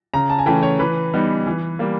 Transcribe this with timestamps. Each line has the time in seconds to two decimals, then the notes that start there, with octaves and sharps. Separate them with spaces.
0.14 C#3 A#5
0.30 A5
0.39 G#5
0.46 E3 A3 C#4 G5
0.63 C#5
0.79 E3 B4
1.14 G3 B3 D#4
1.47 E3
1.79 G3 A#3